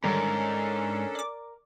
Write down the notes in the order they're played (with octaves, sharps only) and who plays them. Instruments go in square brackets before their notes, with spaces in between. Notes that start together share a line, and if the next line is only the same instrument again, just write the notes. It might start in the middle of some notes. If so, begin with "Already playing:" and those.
[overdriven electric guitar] G#2 [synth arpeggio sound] D3 D#3 G3 [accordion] C#4 D4 A4 [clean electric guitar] A#4
[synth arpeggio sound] D5 D6